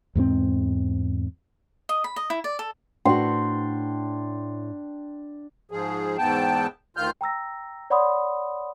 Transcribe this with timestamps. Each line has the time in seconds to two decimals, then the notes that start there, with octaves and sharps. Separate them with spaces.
0.15 E2 G#2 G#3 C4
1.89 D#5
2.04 B5
2.16 D#5
2.30 E4
2.44 D5
2.59 A4
3.05 A2 D4 F#4 G5 C6
5.71 G#2 F3 G#4
6.18 E2 G#2 B3 G5 A5
6.97 D2 D#3 F4 F6 G6
7.21 G5 A#5 E6 A#6
7.90 C#5 D5 F#5 B5 C6 D#6